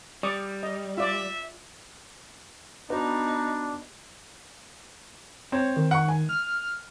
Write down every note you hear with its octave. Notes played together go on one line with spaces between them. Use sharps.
G3 D5 C#6 D#6
D#5
F4 D5 E5
B3 D4 D#4 F#4 B4
C4 C#5
D#3
F#5 C#6
G#5
F6